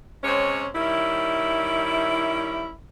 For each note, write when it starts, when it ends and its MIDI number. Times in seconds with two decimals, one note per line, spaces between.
0.23 0.68 48
0.23 0.68 56
0.23 0.68 60
0.23 0.68 61
0.23 0.68 73
0.75 2.73 51
0.75 2.73 55
0.75 2.73 61
0.75 2.73 64